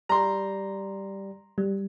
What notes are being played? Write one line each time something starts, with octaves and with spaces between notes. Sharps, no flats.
G3 A#5 C6
G3